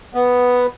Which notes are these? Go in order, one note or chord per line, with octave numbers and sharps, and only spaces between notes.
B3